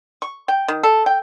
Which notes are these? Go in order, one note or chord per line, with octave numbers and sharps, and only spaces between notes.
C#6
G5
D#3
A4
G5